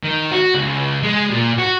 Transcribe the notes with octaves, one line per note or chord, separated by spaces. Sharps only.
D#3
F#4
C#2
G#3
A#2
F#4